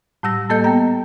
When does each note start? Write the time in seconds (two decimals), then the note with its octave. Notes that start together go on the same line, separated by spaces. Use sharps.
0.23 A2 G3 E6 A#6
0.50 A2 A#3 A4 D#5 G6
0.64 B3 G5 A#5